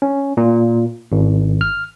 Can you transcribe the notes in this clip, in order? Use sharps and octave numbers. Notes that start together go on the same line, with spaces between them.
C#4
A#2
G#1
F6